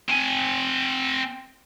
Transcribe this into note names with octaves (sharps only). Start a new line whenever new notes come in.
C4 G#5